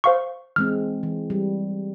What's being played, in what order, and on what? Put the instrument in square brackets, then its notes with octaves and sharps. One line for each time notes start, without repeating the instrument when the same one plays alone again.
[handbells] C5 F5 C#6
[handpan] E3 G#3 C4 [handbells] F6
[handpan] E3
G3